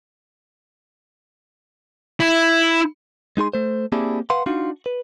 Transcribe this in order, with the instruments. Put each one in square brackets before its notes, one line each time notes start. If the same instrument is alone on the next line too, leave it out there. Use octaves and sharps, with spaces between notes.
[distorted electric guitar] E4
[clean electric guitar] G#3 D#4 G#4 C6
A3 C5
A#3 C4 D4 E4 G4 G#4
B4 F5 F#5 C6
D4 D#4 F4 F#4
B4